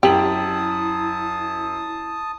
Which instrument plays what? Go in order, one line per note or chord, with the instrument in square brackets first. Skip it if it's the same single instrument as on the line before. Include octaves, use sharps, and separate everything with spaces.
[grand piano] F#2 F#7 [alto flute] E4 [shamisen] G4 [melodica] A5 D#6